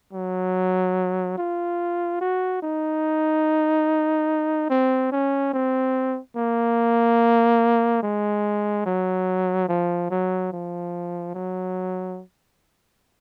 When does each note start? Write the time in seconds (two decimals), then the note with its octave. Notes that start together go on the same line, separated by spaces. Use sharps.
0.13 F#3
1.38 F4
2.21 F#4
2.63 D#4
4.70 C4
5.12 C#4
5.54 C4
6.36 A#3
8.03 G#3
8.86 F#3
9.69 F3
10.11 F#3
10.52 F3
11.34 F#3